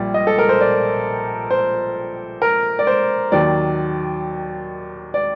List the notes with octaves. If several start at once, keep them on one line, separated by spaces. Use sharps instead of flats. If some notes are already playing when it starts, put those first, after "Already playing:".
Already playing: A#1 A#2 G3 D5
D#5
A4
A#4
C5
D5
C5
A#4
D5
C5
D#2 D#3 F#3 D5
D5